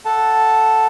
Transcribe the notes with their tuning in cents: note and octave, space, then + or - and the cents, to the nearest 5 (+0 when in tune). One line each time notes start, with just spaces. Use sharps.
A4 +0 F#5 +0 A5 +0